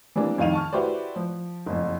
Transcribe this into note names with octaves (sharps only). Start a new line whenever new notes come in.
E3 G3 A#3 C4 D4
F2 D#3 F5 D#7 F7
A5 C#6 F6
E4 F#4 G4 B4 C5 D5
F3
F#1 F2